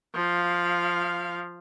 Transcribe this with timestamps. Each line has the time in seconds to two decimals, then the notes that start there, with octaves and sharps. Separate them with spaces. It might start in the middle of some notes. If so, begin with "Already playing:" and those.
0.15 F3 F5